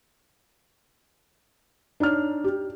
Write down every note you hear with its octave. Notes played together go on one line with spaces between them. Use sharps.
D4 D#4 C#5 F6
G4